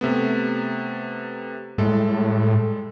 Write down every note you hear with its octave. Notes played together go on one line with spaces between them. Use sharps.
C3 A3 B3
A2 G3 G#3 A4